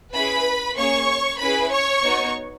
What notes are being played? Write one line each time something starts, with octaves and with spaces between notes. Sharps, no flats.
C#4 E4 G#4 B4 B5
A#3 C#4 G#4 C#5 C#6
C#4 E4 G#4 B4 B5
C#5 C#6
B3 D#4 F#4